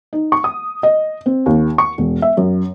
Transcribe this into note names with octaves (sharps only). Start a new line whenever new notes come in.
D#4
C#6
D#6
D#5
C4
D#2
C#6
E1
E5
F#2